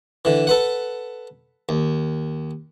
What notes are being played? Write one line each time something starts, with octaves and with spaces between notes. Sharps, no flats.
D3 E3
A4 B4 F#5
D#2